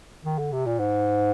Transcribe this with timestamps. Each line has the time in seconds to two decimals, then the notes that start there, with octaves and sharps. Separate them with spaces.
0.24 D#3
0.38 D3
0.52 C3
0.66 A#2
0.79 G#2